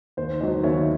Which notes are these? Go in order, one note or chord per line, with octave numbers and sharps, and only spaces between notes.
D#2 C5
D#3 F#3 C5 D#5
D#2 C#5 E5